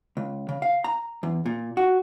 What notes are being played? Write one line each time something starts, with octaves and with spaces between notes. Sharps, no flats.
C#2
C#3
F5
A#5
E2
A#2
F#4